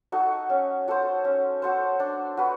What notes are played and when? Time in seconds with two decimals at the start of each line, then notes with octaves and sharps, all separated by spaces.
0.12 D#4 F#4 A4
0.50 C#4
0.88 F#4 A4 C5
1.25 C#4
1.62 F#4 A4 C5
2.00 D4
2.37 F#4 B4